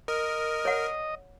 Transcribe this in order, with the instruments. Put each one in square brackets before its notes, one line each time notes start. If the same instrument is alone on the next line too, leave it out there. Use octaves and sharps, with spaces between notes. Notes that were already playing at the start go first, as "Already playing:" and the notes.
[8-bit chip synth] A#4 [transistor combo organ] D#5
[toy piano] C#5 F#5